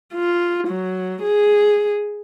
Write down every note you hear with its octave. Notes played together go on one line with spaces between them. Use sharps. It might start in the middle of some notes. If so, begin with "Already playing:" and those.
F4
F#3
G#4